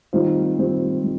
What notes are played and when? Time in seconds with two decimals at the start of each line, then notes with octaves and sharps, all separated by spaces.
0.13 D#3 G3 C4 F4 C5
0.58 D#3 G3 C4 F4 C5
1.04 G3